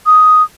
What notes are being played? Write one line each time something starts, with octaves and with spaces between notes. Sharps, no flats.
D#6